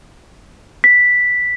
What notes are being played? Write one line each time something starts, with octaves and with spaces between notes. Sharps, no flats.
B6